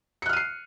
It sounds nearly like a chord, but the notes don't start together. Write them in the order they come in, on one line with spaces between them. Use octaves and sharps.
C#7 F#6 F6 D#7 C7